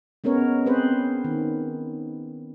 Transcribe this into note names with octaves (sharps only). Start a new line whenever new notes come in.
G#3 B3 C#4 A#4 C#5
C4 G#4 B4 C5
D#3